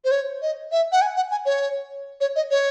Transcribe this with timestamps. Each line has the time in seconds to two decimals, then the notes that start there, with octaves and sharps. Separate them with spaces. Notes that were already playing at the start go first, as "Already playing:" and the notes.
0.05 C5
0.11 C#5
0.42 D#5
0.72 E5
0.92 F#5
1.02 G#5
1.16 F#5
1.31 G#5
1.46 C#5
2.21 C#5
2.36 D#5
2.51 C#5